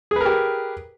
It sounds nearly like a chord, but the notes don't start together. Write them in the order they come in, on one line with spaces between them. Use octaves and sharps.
G#4 B4 A#4 G4